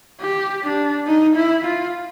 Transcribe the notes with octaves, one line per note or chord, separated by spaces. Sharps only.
G4
D4
D#4
E4
F4